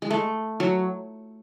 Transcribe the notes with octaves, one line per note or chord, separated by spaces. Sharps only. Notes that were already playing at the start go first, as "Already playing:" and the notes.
G#3
A3
F#3